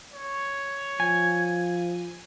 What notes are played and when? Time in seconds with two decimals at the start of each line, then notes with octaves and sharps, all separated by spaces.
0.12 C#5
1.00 F3 G#5